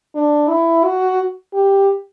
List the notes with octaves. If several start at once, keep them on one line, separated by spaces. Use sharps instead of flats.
D4
E4
F#4
G4